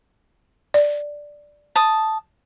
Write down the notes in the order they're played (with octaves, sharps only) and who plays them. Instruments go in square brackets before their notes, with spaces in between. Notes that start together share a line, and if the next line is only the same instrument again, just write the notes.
[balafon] D5
[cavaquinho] A5 D#6